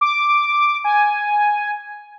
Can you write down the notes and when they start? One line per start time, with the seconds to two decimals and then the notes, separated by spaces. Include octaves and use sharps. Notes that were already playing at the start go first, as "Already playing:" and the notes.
0.01 D6
0.84 G#5